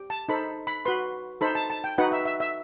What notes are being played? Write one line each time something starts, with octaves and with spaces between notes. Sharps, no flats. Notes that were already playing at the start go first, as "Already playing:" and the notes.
Already playing: G4
A5
D#4 A4 C5 B5
B5
F#4 B4 C6
D#4 A4 C5 B5
A5
A5
G5
D#4 F#4 B4 F#5
E5
E5
E5